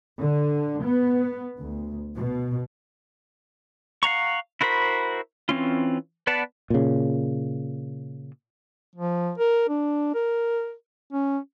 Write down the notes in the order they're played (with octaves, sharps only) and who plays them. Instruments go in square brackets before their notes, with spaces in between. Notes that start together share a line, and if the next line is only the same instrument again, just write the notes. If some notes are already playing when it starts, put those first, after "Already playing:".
[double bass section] D3
B3
D2
B2
[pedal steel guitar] F5 F#5 A#5 C#6
E4 F#4 A#4 C5 B5
E3 C4 C#4 F4
B3 B4 D5 F#5 A5
[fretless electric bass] A#2 C#3
[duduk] F3
A#4
D4
A#4
C#4